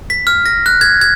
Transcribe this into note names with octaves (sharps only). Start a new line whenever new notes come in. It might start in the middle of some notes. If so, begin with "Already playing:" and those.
B6
F6
A#6
F#6
G#6
G#6